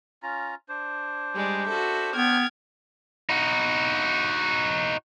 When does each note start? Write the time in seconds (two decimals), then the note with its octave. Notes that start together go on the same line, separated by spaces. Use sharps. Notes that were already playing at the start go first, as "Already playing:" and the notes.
0.23 C#4 F4 A#5
0.69 D4 C5
1.33 G3 G#3 D5
1.67 F#4 A4 E5
2.15 B3 G5 F6 G#6
3.29 D#4 F#4